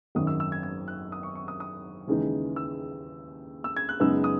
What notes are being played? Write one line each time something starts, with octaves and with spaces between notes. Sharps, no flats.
G#1 F#2 D#3 D#6
E6
E6
G#6
G#6
F#6
D#6
C#6
C#6
D#6
D#6
D#2 C#3 E3 G#3 D#4
E6
E6
G#6
F#6
F#2 C#3 G#3 B3 D#4 E6
D#6